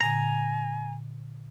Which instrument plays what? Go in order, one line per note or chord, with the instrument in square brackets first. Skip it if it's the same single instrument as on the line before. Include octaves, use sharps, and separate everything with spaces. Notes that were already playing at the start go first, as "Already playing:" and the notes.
[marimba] A#2 D3 [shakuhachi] G#5 [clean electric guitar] A#5